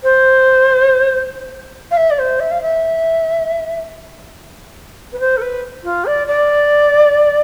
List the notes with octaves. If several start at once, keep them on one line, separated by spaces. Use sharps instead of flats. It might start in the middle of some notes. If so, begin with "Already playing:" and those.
C5
F5
E5
D5
C5
E5
F5
E5
B4
C5
A4
B4
F4
D5
D5